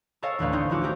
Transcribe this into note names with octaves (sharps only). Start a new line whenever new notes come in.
A4 A#4 C#5 D#5 F5 G#5
A1 D2 B4 F5
C4 C#4 D#4
F3 E4 F#4 G#5 D6
D#4 E4 G4 A#4 C#5